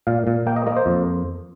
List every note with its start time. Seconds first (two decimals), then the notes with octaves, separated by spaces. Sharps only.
0.07 A#2 F5
0.27 A#2
0.47 A#3 G5
0.56 D#5
0.67 A#3 D#5
0.77 C5
0.86 F2